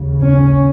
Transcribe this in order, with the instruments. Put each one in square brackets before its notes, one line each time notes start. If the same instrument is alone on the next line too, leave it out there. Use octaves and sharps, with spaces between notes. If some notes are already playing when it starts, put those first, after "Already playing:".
Already playing: [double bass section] D#2 C#3
C#4